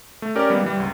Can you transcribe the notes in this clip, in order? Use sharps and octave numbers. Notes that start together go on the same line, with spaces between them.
A3
C#4 G4 A#4 D5
G3 G#3 A#3 B3
E3 G3
G1 C#2